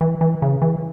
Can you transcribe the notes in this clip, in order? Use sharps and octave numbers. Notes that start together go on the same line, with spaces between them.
E3
E3
C#3
E3